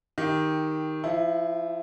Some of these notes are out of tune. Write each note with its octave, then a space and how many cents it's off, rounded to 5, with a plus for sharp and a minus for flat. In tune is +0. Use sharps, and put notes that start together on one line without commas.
D#3 +5 G4 +0
F3 -25 E4 +0